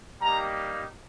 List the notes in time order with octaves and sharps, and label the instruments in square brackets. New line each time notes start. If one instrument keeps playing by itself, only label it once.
[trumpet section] G3 A#3 D#4 G4 A#5